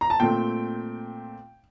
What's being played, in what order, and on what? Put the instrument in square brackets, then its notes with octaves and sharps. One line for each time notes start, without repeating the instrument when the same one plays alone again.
[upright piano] A#5
A5
A#2 A3 C4 G5